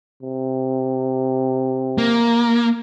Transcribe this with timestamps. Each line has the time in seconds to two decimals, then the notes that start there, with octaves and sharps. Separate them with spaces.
0.23 C3
1.98 A#3